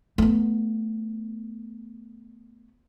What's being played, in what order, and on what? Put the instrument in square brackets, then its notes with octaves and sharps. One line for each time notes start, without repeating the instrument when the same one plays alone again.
[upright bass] A3 B3